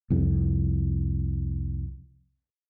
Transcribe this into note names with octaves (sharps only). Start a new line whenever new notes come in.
C2 F2